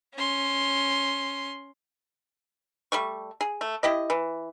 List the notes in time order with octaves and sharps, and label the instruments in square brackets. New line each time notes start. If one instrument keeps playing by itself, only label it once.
[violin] C#4 C6
[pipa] G3 A3 C#6
G#4
A3
E4 G4 D#5
E3